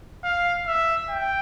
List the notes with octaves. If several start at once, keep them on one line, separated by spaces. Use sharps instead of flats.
F5
E5
G5